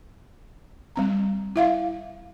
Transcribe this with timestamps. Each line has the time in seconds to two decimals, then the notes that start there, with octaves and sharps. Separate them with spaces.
0.96 G3 C4 A#5
1.56 E4 E5 F5